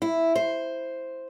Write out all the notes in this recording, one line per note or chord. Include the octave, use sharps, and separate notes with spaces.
E4
C5